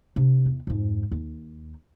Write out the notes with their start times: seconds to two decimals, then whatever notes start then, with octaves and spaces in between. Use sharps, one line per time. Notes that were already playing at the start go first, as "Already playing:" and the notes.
0.16 C3 D4
0.45 E2
0.67 F2 G#2
1.11 D#2